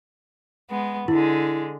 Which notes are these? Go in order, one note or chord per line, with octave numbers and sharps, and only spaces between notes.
G#3 B3
D3 G#3 E4